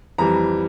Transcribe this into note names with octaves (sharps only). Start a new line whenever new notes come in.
F2 E3 G3 A#5